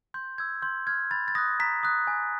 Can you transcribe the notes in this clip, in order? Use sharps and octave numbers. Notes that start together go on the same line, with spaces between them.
C6 G6
E6 G6 G#6
C6 G6
F6 G#6
B5 A6
A6
D#6 F#6 A#6
A#5 B6
D#6 F#6
G#5